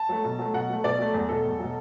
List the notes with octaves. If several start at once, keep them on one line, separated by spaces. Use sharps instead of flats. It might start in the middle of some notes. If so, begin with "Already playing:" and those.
Already playing: A5
F#3 A3
B2
F#3 A3
B2 F#5
F#3 A3
B2 D5
F#3 A3
E2
B2 F#3 A4
E2
B2 F#3